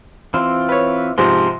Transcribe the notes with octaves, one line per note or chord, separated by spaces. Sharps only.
E3 C4 F4
B4 C#5
G#2 C3 F3 C6